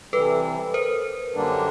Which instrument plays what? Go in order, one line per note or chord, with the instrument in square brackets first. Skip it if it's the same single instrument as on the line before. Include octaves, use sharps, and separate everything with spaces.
[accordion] C3 E3 G3 [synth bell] A4 B4
[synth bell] A#4 C5
[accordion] F#2 D3 G3 A#3 D4